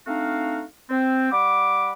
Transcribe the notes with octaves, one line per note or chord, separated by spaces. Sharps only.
A3 C4 D4 D#4 F#4 F5
C4
G3 F#5 B5 D6